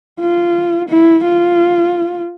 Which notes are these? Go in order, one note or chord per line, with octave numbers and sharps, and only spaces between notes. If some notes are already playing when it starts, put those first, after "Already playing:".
F4
E4
F4